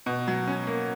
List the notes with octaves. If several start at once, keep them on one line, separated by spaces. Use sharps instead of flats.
B2
F#3
C#4
A#3